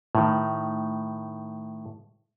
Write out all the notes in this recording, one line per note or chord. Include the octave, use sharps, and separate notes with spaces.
A2 D#3